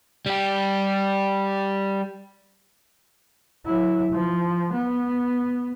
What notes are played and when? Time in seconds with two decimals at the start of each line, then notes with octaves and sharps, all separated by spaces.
0.26 G3 G4
3.66 F#3 E4
4.12 F3
4.73 B3